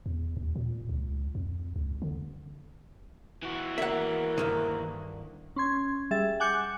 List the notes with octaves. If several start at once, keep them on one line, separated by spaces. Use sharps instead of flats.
E2
D#2
A#2
C#2
F2
C#2
D3
E3 F#4
A#3 E5 F#5
D2 G2 D#3
C#4 C6 G#6
G3 G#4 E5 A6
F#5 G#5 D6 F#6 G6 C#7